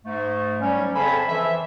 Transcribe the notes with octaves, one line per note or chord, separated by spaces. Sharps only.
G#2 A3
F#3 G3 C#4
F2 C#3 A4 C5 G#5 B5
E3 F3 E5